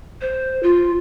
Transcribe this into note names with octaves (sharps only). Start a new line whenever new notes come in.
C5
F4